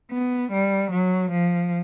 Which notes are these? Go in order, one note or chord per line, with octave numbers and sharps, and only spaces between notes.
B3
G3
F#3
F3